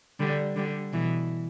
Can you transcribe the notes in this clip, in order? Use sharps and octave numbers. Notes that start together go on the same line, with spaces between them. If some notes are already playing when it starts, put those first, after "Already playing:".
D3 G3
D3 G3
B2 E3